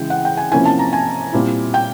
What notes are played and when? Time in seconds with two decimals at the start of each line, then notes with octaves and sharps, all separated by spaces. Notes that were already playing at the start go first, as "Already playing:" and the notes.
Already playing: C#3 E3 G#3 G5
0.10 F#5
0.25 G5
0.37 G#5
0.52 C3 F3 A#3 C#4 E4 G#5
0.65 A5
0.79 A#5
0.93 G#5
1.33 A#2 G3 C4 E4
1.74 G5